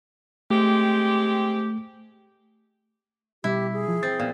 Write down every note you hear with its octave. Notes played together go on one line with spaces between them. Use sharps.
G#3 A3 C4 G4
B2 G3 E4 G4
G#4
F3
C4 A6
A#2 B3 F5